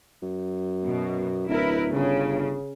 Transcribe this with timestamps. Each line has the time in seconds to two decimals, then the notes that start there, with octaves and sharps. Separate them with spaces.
0.23 F#2
0.86 B2
1.49 D1 E4 A#4 B4
1.94 G1 C#3